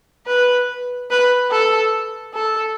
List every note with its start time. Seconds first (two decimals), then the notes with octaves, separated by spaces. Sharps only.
0.27 B4
1.11 B4
1.51 A4
2.34 A4